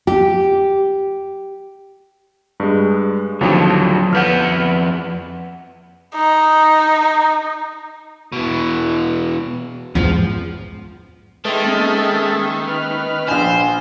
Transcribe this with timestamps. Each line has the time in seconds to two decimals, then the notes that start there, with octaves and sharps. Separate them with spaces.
0.07 G4
2.60 G2 G#3
3.41 D#2 D3 F3 F#3
4.13 F2 B4 F#5 F6 G6
6.15 D#4
8.32 B2 E3
9.95 E2 G#2 F3
11.45 D#3 G#3 A4 B4 E5 G5 C6
11.64 A#3 B3 C#4
12.68 B4 F6
13.28 A#1 C5 G#5